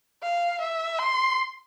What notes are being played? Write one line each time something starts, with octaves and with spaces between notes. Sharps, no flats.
F5
E5
C6